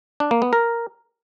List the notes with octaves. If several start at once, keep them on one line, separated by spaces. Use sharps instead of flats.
D4
A#3
B3
A#4